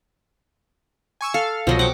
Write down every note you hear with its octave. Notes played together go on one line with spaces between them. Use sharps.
G#5 C#6 E6
A4 F5
C2 B2 F3 F#3 C5 D#5
F#5 G5 D6